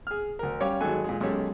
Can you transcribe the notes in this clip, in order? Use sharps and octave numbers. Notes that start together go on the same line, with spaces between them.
G#4 F6
D2 A#4
G3 C#4 C#5 F5 G5 D6
G#1 F#3 G#3 D#4 A4 G#5
A#2 G#3
B1 G#3 C#4 G4 A4 C#5